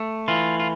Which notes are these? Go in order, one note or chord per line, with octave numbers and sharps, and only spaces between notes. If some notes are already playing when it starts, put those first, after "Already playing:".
Already playing: A3
E3 F4
F4